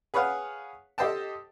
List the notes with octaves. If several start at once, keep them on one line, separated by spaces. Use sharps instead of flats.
G#4 B4 C#5 F5 F#5
G4 A4 C5 D#5 G5 A5